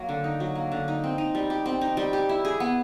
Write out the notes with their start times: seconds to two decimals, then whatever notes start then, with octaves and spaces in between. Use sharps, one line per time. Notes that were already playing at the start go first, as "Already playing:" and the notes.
Already playing: F#3 A#3
0.09 D3
0.24 D#4
0.40 F#3
0.55 A#3
0.72 D3
0.88 D#4
1.04 C4
1.18 D#4
1.35 G3
1.50 G4
1.66 C4
1.81 D#4
1.97 G3
2.13 G4
2.29 E4
2.45 G#4
2.60 B3